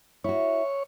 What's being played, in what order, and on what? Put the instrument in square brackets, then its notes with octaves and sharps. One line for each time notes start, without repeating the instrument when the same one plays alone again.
[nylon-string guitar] E4 F#4 [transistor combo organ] C#5